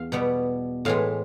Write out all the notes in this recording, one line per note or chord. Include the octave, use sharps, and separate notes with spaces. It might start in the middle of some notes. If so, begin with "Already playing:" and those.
Already playing: E2 F5
B2 G3 B3
A2 E3 G#3 F5